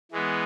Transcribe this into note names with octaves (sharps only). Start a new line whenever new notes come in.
E3 G#3 B3